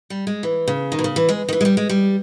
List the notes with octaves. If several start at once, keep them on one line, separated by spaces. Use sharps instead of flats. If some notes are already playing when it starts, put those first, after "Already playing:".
G3
G#3
E3
C#3
D#3
B2
C#3
E3
G#3
D#3
E3
G#3
G3
G#3
G3